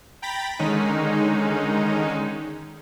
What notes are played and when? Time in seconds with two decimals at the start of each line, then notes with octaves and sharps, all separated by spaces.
0.22 G5 A#5 B5 A6 B6
0.59 D3 D#3 G#3 C#4 D#4